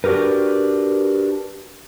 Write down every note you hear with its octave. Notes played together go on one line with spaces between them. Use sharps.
D4 F#4 G4 A#4 B4